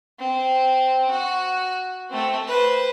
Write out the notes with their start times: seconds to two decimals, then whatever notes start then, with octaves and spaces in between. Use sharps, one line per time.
0.19 C4
1.11 F#4
2.10 A3 C4
2.48 B4 C5